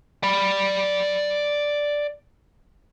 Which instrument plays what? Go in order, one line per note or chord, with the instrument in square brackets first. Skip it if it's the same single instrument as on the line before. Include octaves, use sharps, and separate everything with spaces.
[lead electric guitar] D5 B5